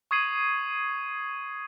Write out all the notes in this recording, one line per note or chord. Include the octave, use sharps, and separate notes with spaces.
C#6 D#6 G#6 C7 D#7 F#7